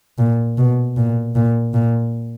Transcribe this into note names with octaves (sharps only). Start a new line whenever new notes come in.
A#2
B2
A#2
A#2
A#2